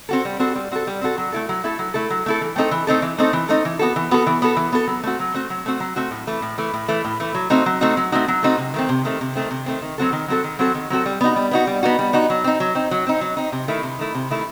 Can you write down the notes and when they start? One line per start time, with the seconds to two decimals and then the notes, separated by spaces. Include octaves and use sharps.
0.09 C4 F#4 A4
0.25 G3
0.39 C4 F#4 A4
0.55 G3
0.71 C4 F#4 A4
0.87 G3
1.01 C4 F#4 A4
1.18 F#3
1.32 A3 E4 A4
1.49 F#3
1.64 A3 E4 A4
1.79 F#3
1.94 A3 E4 A4
2.10 F#3
2.26 A3 E4 A4
2.41 E3
2.56 A3 C4 D#4 A4
2.71 E3
2.87 A3 C4 D#4 A4
3.02 E3
3.18 A3 C4 D#4 A4
3.33 E3
3.49 A3 C4 D#4 A4
3.65 E3
3.79 B3 F#4 A4
3.96 E3
4.11 B3 F#4 A4
4.27 E3
4.42 B3 F#4 A4
4.57 E3
4.72 B3 F#4 A4
4.87 F#3
5.03 A3 C4 F#4
5.19 F#3
5.34 A3 C4 F#4
5.50 F#3
5.66 A3 C4 F#4
5.80 F#3
5.96 A3 C4 F#4
6.11 A2
6.27 E3 A3
6.42 A2
6.58 E3 A3
6.74 A2
6.88 E3 A3
7.05 A2
7.20 E3 A3
7.34 F#3
7.50 A3 C4 D#4 F#4
7.66 F#3
7.81 A3 C4 D#4 F#4
7.97 F#3
8.12 A3 C4 D#4 F#4
8.28 F#3
8.43 A3 C4 D#4 F#4
8.58 C3
8.74 D#3 A3 C4
8.89 C3
9.05 D#3 A3 C4
9.21 C3
9.36 D#3 A3 C4
9.51 C3
9.66 D#3 A3 C4
9.82 D#3
9.98 F#3 C4 F#4 A4
10.12 D#3
10.28 F#3 C4 F#4 A4
10.44 D#3
10.59 F#3 C4 F#4 A4
10.75 D#3
10.90 F#3 C4 F#4 A4
11.06 G3
11.21 B3 D#4 F#4
11.36 G3
11.51 B3 D#4 F#4
11.67 G3
11.83 B3 D#4 F#4
11.99 G3
12.13 B3 D#4 F#4
12.30 F#3
12.44 C4 D#4
12.60 F#3
12.75 C4 D#4
12.91 F#3
13.07 C4 D#4
13.21 F#3
13.37 C4 D#4
13.52 C3
13.68 D#3 A3 E4
13.83 C3
13.99 D#3 A3 E4
14.15 C3
14.30 D#3 A3 E4